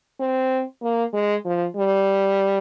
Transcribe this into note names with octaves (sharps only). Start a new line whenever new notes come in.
C4
A#3
G#3
F3
G3